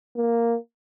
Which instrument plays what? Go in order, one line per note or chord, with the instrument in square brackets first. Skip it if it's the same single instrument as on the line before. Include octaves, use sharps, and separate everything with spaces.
[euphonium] A#3